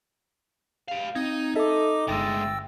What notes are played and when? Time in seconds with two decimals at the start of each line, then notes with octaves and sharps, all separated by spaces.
0.88 G4 F5
1.15 C4 D#4 G#6
1.56 A4 D#5 E5 D6
2.08 G1 D2 G#3 G5 E6 A6 A#6